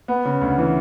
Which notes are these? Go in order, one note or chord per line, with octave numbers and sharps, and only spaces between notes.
B3
C#3
D2
E3